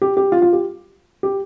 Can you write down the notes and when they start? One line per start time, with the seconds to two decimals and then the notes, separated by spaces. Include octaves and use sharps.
0.02 G4
0.17 G4
0.32 F4
0.42 F4
0.53 G4
1.23 G4